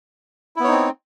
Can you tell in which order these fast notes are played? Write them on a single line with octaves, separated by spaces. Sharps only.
E4 B3 C#5 D#4 C4